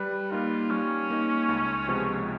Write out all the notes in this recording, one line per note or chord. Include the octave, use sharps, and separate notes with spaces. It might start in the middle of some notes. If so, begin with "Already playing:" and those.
Already playing: G3 B4
A#3 D#4 F4
G3 C#4
A#3 D#4
C#2
C3 F3 G#3 B3